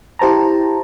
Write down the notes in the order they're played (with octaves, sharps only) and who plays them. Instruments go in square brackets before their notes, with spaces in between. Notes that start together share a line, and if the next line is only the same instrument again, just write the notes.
[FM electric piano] E4 G4 C5 A5 A#5